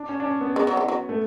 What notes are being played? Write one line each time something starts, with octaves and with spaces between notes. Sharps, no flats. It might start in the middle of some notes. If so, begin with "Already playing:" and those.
Already playing: D4
C#4
D4
C#4
B3
G#3 B3
F#3
E3
F#3
A3